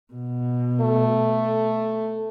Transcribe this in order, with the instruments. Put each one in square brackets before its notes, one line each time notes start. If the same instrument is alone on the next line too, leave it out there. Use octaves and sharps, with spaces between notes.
[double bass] B2
[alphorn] A3